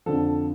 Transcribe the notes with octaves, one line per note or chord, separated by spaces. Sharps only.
F2 D3 F3 A4